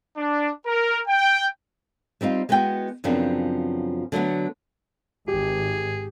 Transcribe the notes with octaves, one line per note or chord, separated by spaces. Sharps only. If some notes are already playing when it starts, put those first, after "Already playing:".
D4
A#4
G5
G3 C4 D#4 F4
G#3 B3 E4 F#4 G5
F#2 C#3 F3 B3 C4 D4
D3 F#3 A3 B3
G#1 G4 G#4